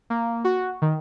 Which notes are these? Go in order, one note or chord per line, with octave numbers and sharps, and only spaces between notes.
A#3
F#4
D#3